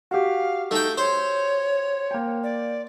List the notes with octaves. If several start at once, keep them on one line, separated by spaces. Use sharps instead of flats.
F#4 G4 F5
A3 D#4 G5
C5 C#5
A#3 G5
D5